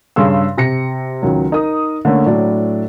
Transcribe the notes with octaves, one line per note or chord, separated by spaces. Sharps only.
G2 C#3 G#4 C6 E6
C3 A#6 C#7
C#2 D#3 F#3
D#4 A#4 D#6
D3 A3 A#3 C#4
A2 F#3 D4